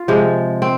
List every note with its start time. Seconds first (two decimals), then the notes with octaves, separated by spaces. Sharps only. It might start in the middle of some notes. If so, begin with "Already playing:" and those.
Already playing: F4
0.08 C3 F3 G#3
0.62 C4